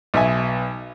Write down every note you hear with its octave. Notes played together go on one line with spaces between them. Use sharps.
B1 E5 G#5